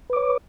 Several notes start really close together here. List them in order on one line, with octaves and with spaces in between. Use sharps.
B4 D6 C#5